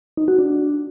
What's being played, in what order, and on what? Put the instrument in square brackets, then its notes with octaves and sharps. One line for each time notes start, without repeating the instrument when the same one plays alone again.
[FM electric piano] D#4
F#4
D4